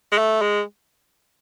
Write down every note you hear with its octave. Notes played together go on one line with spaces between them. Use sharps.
G#3
A3
G#3